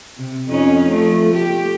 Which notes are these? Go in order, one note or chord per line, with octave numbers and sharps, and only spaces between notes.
C3
F2 C#4 D#4
F3 A3
G4